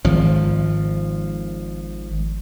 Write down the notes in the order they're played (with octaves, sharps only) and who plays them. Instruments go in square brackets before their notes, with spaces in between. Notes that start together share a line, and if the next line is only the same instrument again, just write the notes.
[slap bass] G#1 F3